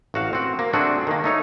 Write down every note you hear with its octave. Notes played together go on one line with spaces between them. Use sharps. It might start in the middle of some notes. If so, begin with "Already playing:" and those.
A1 F#4 F5
C4 F#4
A#3
A3 C4 D4 F#4 G#4
D#3 A#3
A3 D#4 C#5